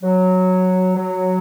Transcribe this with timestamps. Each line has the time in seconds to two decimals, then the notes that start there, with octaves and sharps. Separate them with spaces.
0.03 F#3
0.96 F#3